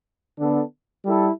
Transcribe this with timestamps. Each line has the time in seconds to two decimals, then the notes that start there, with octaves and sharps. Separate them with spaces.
0.38 D3 B3 D4 A4
1.05 G3 E4 A4